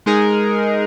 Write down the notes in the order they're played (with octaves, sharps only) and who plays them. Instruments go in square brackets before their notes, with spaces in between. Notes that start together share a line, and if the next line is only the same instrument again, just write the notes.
[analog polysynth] G#3 D#4 G#4 A#4